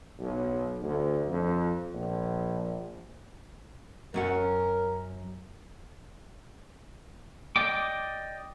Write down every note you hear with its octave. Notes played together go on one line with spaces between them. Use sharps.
B1
D2
F2
A#1
F#2 C#4 A#4 F#5
D5 D#5 G5 D6